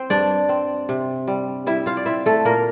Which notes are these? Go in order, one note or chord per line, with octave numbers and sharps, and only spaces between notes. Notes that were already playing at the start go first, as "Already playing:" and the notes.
Already playing: C4 C5
G2 D4 D5
C4
C3
G3
G3 E4 E5
F4 F5
D5
C4 E4 E5
A3 A4
A#2 A#3 A#4